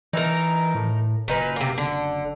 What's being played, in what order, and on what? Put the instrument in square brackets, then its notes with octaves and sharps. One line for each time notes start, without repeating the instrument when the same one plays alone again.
[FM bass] E3 [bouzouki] D#4 A#4
[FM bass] A2
[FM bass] F#1 [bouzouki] A#2 D#4 B4
[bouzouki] C3 A#3
D3